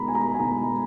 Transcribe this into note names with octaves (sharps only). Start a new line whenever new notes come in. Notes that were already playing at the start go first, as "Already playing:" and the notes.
Already playing: B2 G#3 D#4 A#5 B5
G#5
A#5
G#5
B2 G#3 D#4 A#5